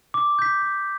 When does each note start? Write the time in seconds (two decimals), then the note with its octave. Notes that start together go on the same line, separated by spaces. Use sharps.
0.14 D6
0.39 G6 B6
0.62 D6